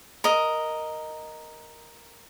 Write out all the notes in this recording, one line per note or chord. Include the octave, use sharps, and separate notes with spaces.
A#4 D#5